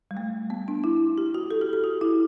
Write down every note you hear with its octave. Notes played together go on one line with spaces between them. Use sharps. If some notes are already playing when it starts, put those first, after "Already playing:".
G3
A3
B3
D4
E4
G4
F#4
A4
G4
G4
F#4
E4